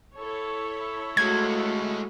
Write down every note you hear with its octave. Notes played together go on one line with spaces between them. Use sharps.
E4 A4 C#5
G#3 A3 F#4 F5 G#6